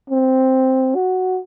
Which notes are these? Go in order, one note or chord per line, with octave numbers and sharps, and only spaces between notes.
C4
F#4